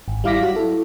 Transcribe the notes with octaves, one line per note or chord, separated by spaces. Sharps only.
G#1
G3 E4 F5 D6 A#6 B6
F#3 F#4
E4 A4